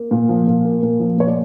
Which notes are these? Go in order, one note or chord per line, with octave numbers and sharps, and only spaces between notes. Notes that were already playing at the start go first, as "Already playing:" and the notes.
Already playing: A#3
A#2
F3
A#2
A#3
A#2
F3
A#2 C#5
D5